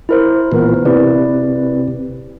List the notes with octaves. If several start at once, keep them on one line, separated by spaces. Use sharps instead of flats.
E4 A#4 C5
A#2 E3 B3 A#4 B4
C3 E4 B4 D5